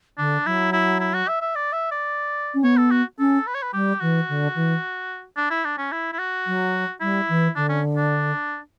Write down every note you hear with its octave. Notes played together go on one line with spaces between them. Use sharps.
D3 D4
F#3 E4
E4
E4
F#4
E5
E5
D5
E5
D5
C#4
B3 C#5
A4
F#4
C#4 A4
B4
C#5
B4
G3 G4
E3 F#4
D3
E3
D4
E4
D4
C#4
E4
E4
F#4
F#3
G3 E4
E3
D3 D4
C#4
D4